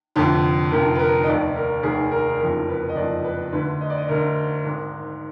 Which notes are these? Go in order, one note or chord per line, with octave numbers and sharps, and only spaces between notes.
F1 F2 D3
F1 F2 D3 A#4
B4
A#4
D#5
F1 D#2 D#3 D5
A#4
F1 D#2 D#3 G#4
A#4
F#1 F2 D#3 A#4
B4
D#5
F#1 F2 D#3 D5
B4
D2 D3 B4
D#5
D5
D#5
D2 D3 A#4
G#1 G#2 D#3